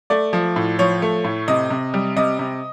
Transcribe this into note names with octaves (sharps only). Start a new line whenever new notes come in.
A3 D5
F3
A2
F3 C#5
A3
A2
C3 D#5
C3
G3
C3 D#5
C3